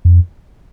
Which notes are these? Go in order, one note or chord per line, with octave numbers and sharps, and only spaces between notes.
F2